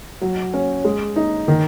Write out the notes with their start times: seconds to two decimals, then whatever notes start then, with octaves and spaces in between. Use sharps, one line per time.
0.21 F#3
0.54 C#4
0.85 G#3
1.16 D#4
1.48 D#3